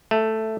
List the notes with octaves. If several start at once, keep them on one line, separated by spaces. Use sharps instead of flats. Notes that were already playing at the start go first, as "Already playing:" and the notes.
A3